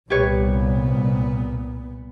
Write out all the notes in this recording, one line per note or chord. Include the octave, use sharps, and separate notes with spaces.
C2 A#2 B3 G4 B4 C#5